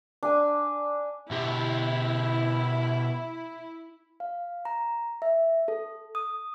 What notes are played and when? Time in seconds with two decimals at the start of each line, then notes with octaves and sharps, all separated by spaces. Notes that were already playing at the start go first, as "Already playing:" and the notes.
0.23 D4 G#5
1.31 B2 E4 G4
4.20 F5
4.65 A#5
5.22 E5
5.68 A4
6.15 D#6